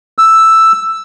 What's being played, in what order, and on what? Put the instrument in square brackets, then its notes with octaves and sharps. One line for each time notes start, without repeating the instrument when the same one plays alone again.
[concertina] E6